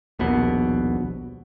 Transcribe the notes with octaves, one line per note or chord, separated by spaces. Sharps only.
D#1 A#1 B2 B3